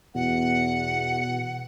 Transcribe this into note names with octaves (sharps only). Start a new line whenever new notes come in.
E2 B2 F#5